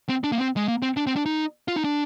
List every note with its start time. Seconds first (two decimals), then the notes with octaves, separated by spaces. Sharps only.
0.09 C4
0.24 D4
0.32 A#3
0.38 C4
0.56 G#3
0.68 A#3
0.82 C4
0.97 D4
1.07 C4
1.16 D4
1.26 D#4
1.68 F4
1.76 D#4
1.84 D4